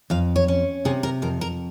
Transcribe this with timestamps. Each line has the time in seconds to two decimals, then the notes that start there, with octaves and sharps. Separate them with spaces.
0.10 F2 F5
0.36 C#5
0.48 C#4
0.85 C3 G#4
1.03 A#4
1.22 F2 A#4
1.41 A#4